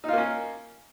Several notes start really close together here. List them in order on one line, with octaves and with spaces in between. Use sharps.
D#4 F4 A#3 C#4